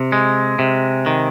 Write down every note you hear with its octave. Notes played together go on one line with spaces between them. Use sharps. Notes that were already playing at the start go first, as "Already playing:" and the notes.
Already playing: C3
G#3
C3
D#3